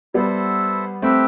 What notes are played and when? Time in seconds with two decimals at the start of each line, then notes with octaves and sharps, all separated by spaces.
0.14 G3 B3 E4 A4 C5 E5
1.02 A3 C4 G4 B4 E5 G5